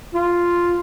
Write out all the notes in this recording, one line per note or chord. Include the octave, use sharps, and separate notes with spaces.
F4